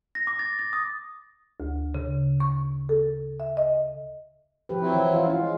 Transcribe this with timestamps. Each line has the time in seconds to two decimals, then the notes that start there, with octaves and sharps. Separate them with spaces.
0.15 A#6
0.27 D6
0.39 A6
0.59 A6
0.73 D#6
1.60 D2
1.95 C#3
2.40 C#6
2.89 A4
3.40 E5
3.57 D#5
4.69 F3 G4 B4
4.81 F#3 C4 E4
4.94 E3
5.11 E3 F4
5.26 C#4 F4
5.39 G#3